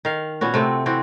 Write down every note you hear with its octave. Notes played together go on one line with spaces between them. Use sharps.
D#3 F5
A#2 B3 C#4 F#4
C3 A3 C4
E3 C4 F#4 G4